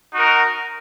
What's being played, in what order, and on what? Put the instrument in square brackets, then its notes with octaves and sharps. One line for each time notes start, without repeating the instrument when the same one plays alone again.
[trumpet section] D#4 F#4 A#4